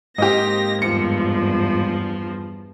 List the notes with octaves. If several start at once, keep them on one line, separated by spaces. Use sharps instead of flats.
G#2 A#3 C4 G4 D#5 A#6
E2 G2 F3 C#7